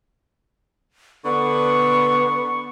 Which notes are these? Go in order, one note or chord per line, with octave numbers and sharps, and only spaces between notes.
D3 B3 C#6